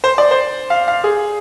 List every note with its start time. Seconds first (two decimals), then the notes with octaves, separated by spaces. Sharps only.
0.04 C5
0.18 D5
0.31 C5
0.70 F5
0.88 F5
1.04 G#4